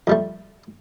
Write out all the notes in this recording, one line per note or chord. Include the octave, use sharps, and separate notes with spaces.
F2 G3 A3